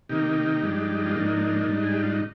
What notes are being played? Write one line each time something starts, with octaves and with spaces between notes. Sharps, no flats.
C3 D#3 A#3 D#4 G4
G2 F3 G#3 D4
F4
G#2 F3 A#3 D4 D#4
G#2 G3 D4
G#4
G4
F4
D#4